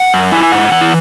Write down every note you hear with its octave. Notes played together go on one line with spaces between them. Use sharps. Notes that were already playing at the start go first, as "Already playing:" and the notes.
Already playing: F#5
F#2
E4 G#5
G#5
G#2 F#5
E3 F#5
E4